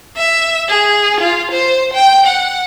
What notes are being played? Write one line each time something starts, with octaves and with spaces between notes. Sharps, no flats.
E5
G#4
F4
C5
G5
F#5